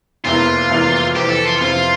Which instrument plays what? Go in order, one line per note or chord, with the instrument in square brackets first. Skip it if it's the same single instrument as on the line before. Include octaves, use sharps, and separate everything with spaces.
[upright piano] F1 E2 E3 A#3 E4 [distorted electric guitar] F4
[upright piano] F1 E2 E3 A#3 E4
[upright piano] F2 C3 E3 [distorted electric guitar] G4
[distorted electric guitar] A4
F4
[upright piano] F2 C3 E3 [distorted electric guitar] F4